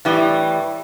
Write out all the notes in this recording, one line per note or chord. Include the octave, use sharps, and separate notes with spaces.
A2 E3 G3